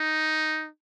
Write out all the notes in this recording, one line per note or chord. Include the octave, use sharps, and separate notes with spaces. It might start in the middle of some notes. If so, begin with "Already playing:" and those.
Already playing: D#4